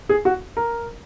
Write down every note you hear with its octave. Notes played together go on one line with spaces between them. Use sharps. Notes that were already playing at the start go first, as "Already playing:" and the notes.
G#4
F#4
A#4